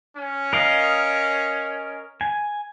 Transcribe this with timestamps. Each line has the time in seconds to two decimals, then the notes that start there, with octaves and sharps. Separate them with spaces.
0.17 C#4
0.53 A#4 D#5 F5
2.21 G#5